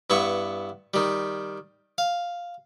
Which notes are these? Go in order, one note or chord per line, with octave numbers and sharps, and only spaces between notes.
G2 B3 E4 C#6
D#3 G3
F5